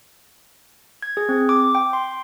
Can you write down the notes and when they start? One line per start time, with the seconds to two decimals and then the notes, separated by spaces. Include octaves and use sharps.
1.02 G#6
1.17 G#4
1.29 C4
1.49 D6
1.75 G5
1.93 C6